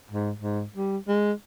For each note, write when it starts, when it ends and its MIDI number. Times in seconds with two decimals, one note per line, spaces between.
0.11 0.31 44
0.38 0.63 44
0.76 0.97 55
1.08 1.32 56